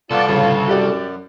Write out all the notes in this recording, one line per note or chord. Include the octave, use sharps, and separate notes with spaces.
C2 B3 F4 A4 D5
G1 A2 C#3 F4
F#2 F#4 G4 D5